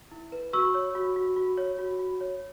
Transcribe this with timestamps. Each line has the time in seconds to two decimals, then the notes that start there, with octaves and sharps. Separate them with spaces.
0.11 E4
0.32 B4
0.53 F#4 C#6 E6
0.74 C#5
0.95 F#4
1.16 F#4
1.36 F#4
1.58 C#5
1.79 F#4
1.99 F#4
2.21 C#5